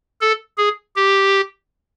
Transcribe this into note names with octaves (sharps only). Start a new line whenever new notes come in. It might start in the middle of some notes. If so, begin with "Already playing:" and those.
A4
G#4
G4